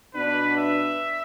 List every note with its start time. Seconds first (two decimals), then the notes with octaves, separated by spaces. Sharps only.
0.14 B2 B3 D4 B4
0.57 E5